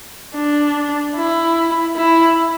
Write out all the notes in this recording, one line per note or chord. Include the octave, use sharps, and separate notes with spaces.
D4
E4
E4